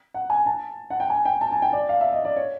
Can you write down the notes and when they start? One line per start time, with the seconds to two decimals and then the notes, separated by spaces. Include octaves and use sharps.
0.14 F#5
0.30 G#5
0.46 A5
0.90 F#5
1.00 G5
1.10 G#5
1.25 G5
1.41 A5
1.52 G#5
1.62 G5
1.73 D5
1.89 F5
2.01 E5
2.13 D#5
2.25 D5
2.36 C#5